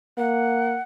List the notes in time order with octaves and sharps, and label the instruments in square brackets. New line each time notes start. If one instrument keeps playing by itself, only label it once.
[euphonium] A#3 [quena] F#5